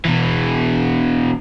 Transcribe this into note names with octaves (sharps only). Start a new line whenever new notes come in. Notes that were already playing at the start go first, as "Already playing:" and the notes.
B2 E3